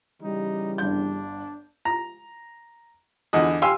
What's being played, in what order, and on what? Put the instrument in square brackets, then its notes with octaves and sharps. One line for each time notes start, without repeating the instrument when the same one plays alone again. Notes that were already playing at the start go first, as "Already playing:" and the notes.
[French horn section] C#3 E3 G3 [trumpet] D#4
[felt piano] G1 G6 [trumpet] D4
[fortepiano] A#5
E2 D3 D#5
G4 F5 G#5 C6 E6